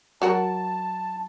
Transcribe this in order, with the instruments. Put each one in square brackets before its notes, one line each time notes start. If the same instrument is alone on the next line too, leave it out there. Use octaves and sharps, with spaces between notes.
[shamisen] F#3 F#4 A#4 [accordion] A5